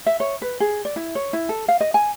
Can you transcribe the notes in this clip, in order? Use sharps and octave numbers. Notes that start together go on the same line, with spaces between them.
E5
C#5
B4
G#4
D5
E4
C#5
E4
A4
F5
D#5
G#5